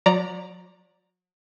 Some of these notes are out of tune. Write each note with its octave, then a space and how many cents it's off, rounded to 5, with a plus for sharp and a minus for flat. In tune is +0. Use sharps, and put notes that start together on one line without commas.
F#3 -40 D5 +0 A#5 +0